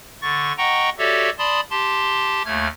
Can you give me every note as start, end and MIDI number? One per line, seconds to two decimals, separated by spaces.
0.22 0.53 50
0.22 0.53 85
0.22 0.53 93
0.58 0.90 75
0.58 0.90 78
0.58 0.90 79
0.58 0.90 82
0.58 0.90 85
0.98 1.30 66
0.98 1.30 67
0.98 1.30 69
0.98 1.30 73
0.98 1.30 74
0.98 1.30 76
1.38 1.60 74
1.38 1.60 81
1.38 1.60 83
1.38 1.60 84
1.38 1.60 87
1.71 2.43 67
1.71 2.43 81
1.71 2.43 84
2.45 2.68 39
2.45 2.68 57
2.45 2.68 89
2.45 2.68 92